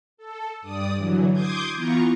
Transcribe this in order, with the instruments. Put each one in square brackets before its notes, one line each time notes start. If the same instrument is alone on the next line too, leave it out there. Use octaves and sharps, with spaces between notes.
[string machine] A4
G2 D5 D#6
D3 E3 F#3
C6 D6 D#6 G6 G#6
E3 B3 F4 A#5 C#6